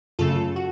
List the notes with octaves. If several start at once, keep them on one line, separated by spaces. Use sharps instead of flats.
F#2 C#3 A3 F4 A4
F#4